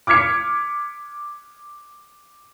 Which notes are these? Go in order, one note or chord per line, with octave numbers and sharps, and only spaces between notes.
D6 F6 G#6 B6 C#7